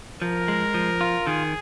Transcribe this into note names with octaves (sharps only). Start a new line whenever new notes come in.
F3 A#4
G#3
F3
F4
D#3 G#4